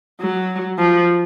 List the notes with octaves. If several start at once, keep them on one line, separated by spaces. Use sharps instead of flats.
F#3
F3